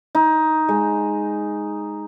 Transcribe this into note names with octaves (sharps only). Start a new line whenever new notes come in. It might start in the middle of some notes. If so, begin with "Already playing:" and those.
D#4
G#3